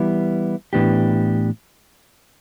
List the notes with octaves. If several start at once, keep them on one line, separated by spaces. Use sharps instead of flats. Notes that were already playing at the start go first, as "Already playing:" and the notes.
Already playing: E3 G3 B3 E4
A2 E3 B3 D4 G4